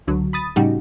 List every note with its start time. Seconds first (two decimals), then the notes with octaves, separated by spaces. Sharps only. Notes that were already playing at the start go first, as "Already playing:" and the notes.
0.07 C#2 D3 F#3
0.33 B5 D#6 A6
0.56 A2 C#3 G3 D#4 F#4 G4